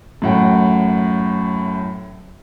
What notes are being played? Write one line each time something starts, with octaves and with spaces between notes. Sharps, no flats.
F#2 A2 F#5 G5